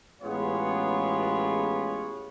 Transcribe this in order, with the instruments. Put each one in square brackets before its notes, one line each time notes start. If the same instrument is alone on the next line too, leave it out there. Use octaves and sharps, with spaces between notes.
[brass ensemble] A1 G#3 B3 F4 C#5